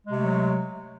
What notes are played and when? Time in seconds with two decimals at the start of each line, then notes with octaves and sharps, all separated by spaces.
0.06 G#3
0.11 C3
0.16 A3
0.21 F#3